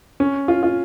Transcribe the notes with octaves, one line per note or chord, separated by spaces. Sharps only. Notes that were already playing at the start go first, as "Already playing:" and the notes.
C#4
F4
F4